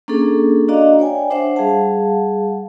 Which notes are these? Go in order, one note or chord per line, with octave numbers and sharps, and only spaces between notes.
A#3 C#4 D4 G#4 A4
D4 F#4 D5 D#5 F5 A#5
C#5 D5 G5 G#5
D4 C5 E5 F#5
G3 G#4 F5 F#5 A5